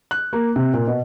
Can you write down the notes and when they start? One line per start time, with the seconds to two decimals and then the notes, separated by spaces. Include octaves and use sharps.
0.11 F#6
0.33 A#3
0.56 C3
0.73 A#2
0.87 B2